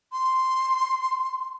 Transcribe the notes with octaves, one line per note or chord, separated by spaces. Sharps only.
C6